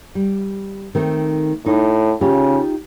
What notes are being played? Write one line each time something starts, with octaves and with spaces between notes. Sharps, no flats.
G3
D#3 A3 C4
A2 D#4
C#3 D#4 F4 G4